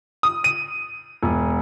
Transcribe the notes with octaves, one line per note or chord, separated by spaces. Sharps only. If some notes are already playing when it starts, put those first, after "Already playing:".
D#6
D#7
E1